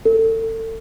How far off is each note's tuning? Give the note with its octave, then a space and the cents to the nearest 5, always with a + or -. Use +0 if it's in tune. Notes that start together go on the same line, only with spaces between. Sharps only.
A4 +30